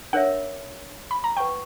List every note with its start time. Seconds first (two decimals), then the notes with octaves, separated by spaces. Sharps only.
0.13 D4 A#4 C#5 E5 F#5
1.11 B5
1.24 A#5
1.37 B4 F#5 G5 A#5 C#6